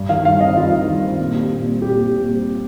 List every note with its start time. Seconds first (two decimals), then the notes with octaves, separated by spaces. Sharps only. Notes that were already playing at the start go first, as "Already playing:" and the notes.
Already playing: G2
0.09 D#3 F5
0.25 G2 F5
0.40 C4 D#5
0.56 G2 F4
0.72 D#3
0.87 G2
1.03 C4
1.18 A#2
1.35 G3
1.51 A#2
1.66 C4
1.82 A#2 G4
1.98 G3
2.13 A#2
2.30 C4